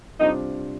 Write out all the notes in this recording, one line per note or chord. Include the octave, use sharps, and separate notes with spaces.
C3 G3 D4 D#4 F4 C5